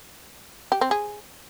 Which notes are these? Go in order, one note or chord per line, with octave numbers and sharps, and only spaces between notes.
G4
C4
G#4